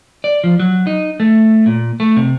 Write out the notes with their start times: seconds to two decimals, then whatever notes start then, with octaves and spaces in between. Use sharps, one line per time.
0.24 D5
0.44 F3
0.60 F#3
0.87 D#4
1.20 A3
1.66 A#2
2.00 A3
2.16 C3